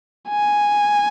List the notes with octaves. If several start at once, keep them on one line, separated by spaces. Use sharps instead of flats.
G#5